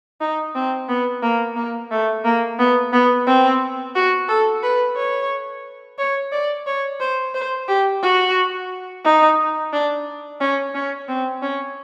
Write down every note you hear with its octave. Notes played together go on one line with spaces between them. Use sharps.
D#4
C4
B3
A#3
A#3
A3
A#3
B3
B3
C4
F#4
A4
B4
C#5
C#5
D5
C#5
C5
C5
G4
F#4
D#4
D4
C#4
C#4
C4
C#4